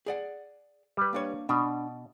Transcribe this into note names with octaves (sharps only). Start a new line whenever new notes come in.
G#4 D5 F#5
G3 B4
A#3 D4 C#5
B2 D4 B5